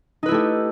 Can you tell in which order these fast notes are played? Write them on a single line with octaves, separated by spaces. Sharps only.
D#4 B4 E4 A3 G4